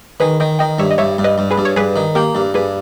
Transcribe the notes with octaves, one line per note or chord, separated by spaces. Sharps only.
D#3 G#4 B4
D#3 D#5 G5
D#3 D#5 G5
G2 C#5 E5
D#5
G2 C#5 E5
G2
B4 D#5
G2
G#4 B4
G2
C#5
G2 G#4 B4
D#3
A#3 G4 A#4
G2
G2 G#4 B4